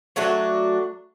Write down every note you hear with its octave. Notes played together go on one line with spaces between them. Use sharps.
F#3 A3 D4 F#4